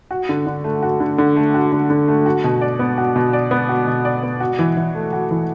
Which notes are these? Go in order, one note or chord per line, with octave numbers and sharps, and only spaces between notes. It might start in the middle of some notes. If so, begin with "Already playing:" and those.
F#4
D3
D3
A3
F#4
D3
D3
A3
F#4
D3
D3
A3
F#4
B2
D5
B3
F#4
B2
D5
B3
F#4
B2
D5
B3
F#4
E3
E3
A3
F#4
E3